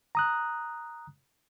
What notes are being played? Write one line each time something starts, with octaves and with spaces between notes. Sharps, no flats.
A#5 D#6 F#6